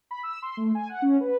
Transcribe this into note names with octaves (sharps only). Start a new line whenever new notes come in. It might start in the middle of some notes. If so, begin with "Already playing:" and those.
B5
E6
C6
A3
G#5
F#5
C#4
B4